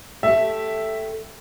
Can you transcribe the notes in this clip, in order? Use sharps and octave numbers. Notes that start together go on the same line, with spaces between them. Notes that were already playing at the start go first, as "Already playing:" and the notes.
A3 G4 E5